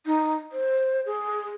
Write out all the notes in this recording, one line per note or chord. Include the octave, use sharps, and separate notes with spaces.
D#4
C5
G#4